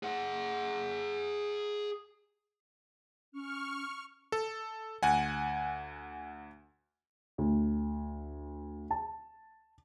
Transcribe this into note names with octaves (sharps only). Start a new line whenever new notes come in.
G#4 F#5
C#4 C#6 F6
A4
D2 F#5 G#5
D2
A5